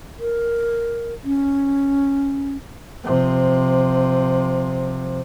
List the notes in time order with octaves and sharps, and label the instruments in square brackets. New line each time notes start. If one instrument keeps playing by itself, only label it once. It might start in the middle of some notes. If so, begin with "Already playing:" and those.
[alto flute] A#4
C#4
[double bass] C3 F3